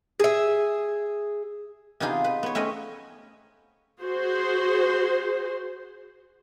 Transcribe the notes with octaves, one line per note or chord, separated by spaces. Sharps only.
G#4 E5
C3 B3 D#4 F4 G#4
B4
B3 C#5
A3 C4 C#4 B4 C#5 D#5
F#4 G#4 C5